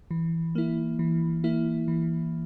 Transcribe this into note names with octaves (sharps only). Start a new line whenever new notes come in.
E3
A#3 E4
E3
A#3 E4
E3